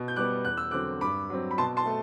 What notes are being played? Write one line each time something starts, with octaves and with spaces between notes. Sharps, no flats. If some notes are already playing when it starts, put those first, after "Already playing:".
Already playing: B2
G6
G3 B3 D6 F#6
E2 F#6
E6
D3 F#3 C4 D6 F#6
G2 B5 D6
F#3 C4
B5
B2 A5 C6
A5 C6
A3